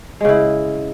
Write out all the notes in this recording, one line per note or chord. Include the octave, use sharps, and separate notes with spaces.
C#3 G#3 E4